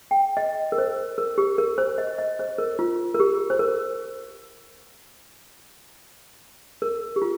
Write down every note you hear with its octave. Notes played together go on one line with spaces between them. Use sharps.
G5
D#5
A#4
C5
A#4
G4
A#4
C5
D#5
D#5
C5
A#4
F4
A#4
G4
C5
A#4
A#4
G4
F4